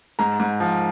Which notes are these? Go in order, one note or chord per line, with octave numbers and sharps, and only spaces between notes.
G#2 A#5
G#2
F3